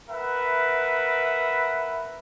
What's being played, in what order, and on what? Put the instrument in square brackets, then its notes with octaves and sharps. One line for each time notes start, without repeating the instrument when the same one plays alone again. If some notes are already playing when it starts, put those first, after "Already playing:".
[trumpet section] A#4 B4 E5 F#5 B5